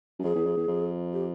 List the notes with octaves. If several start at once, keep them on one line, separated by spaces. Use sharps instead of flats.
F#2
F2 G#4
E2
F2
E2
F2
G4